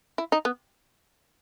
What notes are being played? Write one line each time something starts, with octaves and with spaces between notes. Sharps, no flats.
E4
D#4
B3